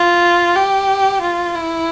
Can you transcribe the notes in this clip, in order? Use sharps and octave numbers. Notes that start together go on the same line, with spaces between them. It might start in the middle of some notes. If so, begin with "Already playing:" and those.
Already playing: F4
G4
F4
E4